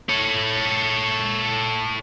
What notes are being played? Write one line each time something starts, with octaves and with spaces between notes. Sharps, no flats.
A4 C#5